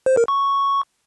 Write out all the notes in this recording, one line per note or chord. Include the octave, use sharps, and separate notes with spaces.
C5
A#4
C#6